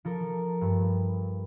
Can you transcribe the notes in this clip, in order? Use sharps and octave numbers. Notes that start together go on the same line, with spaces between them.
F3 A4 A#4
G2